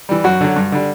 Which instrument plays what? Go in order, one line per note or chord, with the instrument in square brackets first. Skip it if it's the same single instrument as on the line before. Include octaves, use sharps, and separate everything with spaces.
[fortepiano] E3 G3
F#2 F#4
D3 F#3
G2
D3 G3